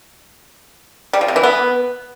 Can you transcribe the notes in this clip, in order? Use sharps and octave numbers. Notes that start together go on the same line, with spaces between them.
G3
F3
C3
E3
B3